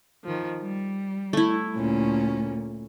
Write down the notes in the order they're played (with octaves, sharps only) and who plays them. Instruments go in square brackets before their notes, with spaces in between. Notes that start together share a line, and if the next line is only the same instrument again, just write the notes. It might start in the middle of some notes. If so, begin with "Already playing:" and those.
[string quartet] D#3 F3
G3
[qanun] A3 E4
[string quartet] D2 A#2 C#4